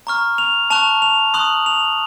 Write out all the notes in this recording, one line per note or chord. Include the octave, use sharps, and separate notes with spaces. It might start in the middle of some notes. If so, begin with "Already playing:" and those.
A#5 C#6 F6
F7
A5 C#6 F#6 F7
F7
C6 D#6 F#6 F#7
F7